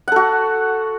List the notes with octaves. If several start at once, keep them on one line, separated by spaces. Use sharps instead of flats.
F#4 A4 F#5